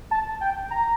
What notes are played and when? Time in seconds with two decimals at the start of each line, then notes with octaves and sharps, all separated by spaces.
0.11 A5
0.41 G5
0.71 A#5